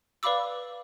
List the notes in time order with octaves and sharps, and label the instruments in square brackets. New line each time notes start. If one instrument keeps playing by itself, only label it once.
[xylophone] B4 D5 F5 B5 D6 E6